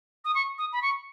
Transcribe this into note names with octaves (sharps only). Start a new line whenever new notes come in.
D#6
C#6
D#6
B5
C#6